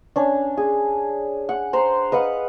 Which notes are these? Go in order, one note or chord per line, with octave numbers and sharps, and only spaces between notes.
C#4 D4
G#4
F#5
C5 A#5 C6
B4 D#5 F5 F#5